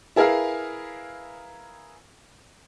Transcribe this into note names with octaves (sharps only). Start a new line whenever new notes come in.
E4 G#4 A#4 B4 F5